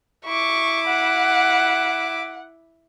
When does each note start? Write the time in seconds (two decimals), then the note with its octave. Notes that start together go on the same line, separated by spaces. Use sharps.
0.26 E4 C#6 D6
0.88 F#5